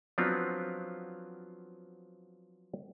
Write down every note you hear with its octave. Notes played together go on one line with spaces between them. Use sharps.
F3 F#3 B3 C4 D4 F4